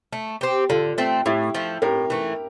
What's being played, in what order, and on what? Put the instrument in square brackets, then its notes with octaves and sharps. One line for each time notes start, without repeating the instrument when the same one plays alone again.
[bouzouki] A3
C4 G4
[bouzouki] D3 [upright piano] F4 A4
[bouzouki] A3 C4
[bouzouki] A2 [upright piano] E4 G4
[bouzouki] F3 A3
[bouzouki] A2 [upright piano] G4 A#4
[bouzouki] E3 A3